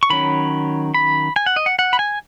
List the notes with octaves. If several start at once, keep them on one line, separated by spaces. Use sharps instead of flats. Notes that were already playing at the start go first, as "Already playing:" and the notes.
C#6
D#3 F#3 C#4 B5
B5
G#5
F#5
D#5
F#5
F#5
B5
G#5